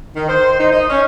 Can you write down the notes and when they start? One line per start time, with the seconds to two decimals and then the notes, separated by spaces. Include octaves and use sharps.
0.15 D#3
0.29 C5
0.60 D#4
0.73 D#5
0.89 C#4